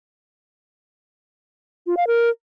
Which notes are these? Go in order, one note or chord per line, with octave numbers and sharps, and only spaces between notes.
F4
F5
A#4